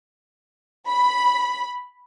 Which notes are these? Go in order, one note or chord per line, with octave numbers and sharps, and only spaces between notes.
B5